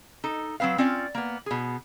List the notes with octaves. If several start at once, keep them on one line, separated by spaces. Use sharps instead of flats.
D#4 A4
F#3 G#3 C4 B4 F5
C4 C#4 F4 D5
A#3 B3
B2 G#4